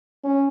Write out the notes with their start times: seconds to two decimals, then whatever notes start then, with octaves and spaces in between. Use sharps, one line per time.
0.24 C#4